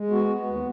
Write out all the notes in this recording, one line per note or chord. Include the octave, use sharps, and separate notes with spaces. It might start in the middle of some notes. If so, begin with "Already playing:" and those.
Already playing: G#3
B3 F#4
B3
D#2